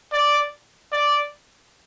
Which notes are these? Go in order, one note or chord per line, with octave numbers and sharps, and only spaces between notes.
D5
D5